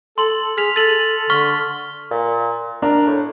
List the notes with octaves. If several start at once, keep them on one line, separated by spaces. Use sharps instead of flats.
A4 C6 F#7
G#4 F6 B6 F7
A4 A6 D#7 F#7
D3 C#6 F6 B6
A#2
D4 A#4
A2